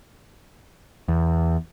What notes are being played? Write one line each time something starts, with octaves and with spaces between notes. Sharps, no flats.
E2